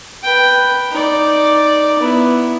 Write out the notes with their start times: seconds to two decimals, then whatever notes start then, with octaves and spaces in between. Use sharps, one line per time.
0.23 B4 G5
0.91 D#4 D5
1.99 B3 E4